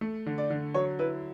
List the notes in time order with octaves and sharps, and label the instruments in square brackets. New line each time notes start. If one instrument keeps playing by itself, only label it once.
[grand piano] A3
D3
[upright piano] D5
[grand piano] D3
[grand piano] F#3 [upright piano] C#5
[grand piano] E4 [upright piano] B4